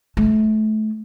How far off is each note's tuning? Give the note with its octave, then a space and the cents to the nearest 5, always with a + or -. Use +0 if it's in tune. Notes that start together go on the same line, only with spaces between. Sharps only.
A3 -25